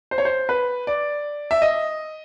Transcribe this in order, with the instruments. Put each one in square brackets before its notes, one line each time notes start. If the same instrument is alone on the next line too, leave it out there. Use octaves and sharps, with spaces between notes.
[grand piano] C5
C#5
C5
B4
D5
E5
D#5